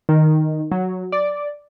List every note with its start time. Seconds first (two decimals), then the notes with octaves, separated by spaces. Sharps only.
0.09 D#3
0.71 F#3
1.12 D5